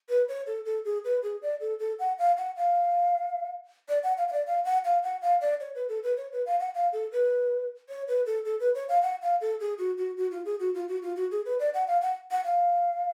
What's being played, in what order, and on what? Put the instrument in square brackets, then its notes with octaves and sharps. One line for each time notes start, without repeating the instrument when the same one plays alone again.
[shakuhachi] B4
C#5
A4
A4
G#4
B4
G#4
D5
A4
A4
F#5
F5
F#5
F5
D5
F#5
F5
F5
D5
F5
F#5
F5
F#5
F5
D5
C#5
B4
A4
B4
C#5
B4
F5
F#5
F5
A4
B4
C#5
B4
A4
A4
B4
C#5
F5
F#5
F5
A4
G#4
F#4
F#4
F#4
F4
G#4
F#4
F4
F#4
F4
F#4
G#4
B4
D5
F#5
F5
F#5
F#5
F5